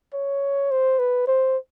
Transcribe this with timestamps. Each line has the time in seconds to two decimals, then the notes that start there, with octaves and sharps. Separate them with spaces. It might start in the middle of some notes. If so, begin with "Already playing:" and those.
0.14 C#5
0.71 C5
0.99 B4
1.27 C5